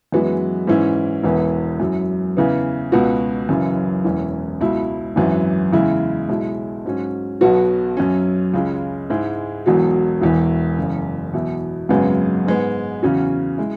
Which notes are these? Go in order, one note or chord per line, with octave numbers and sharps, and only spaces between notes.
F#2 E3 G#3 B3 F#4
G#2 E3 C#4 E4
E1 E2 E3 B3
F#2 F#3 E4
E2 C#3 E3 B3
C#2 B2 B3 F#4
F#1 F#2 C#3 E3
E1 E2 E3 C#4
C#2 B2 F#3 E4
G#1 F#2 E3
E2 C#3 G#3 E4
B1 B2 G#3 E4
G#2 F#3 C#4
B1 B2 F#3 B3 F#4
F#2 F#3 C#4
C#2 C#3 G#3 C#4
G#2 G#3 E4
E1 E2 B2 F#3
E1 E2 E3
F#1 E2 C#3
E2 B2 F#3 E4
G#1 F#2 C#3 G#3 B3
G#2 G#3 B3
E2 C#3 F#3 C#4 F#4
G#3 E4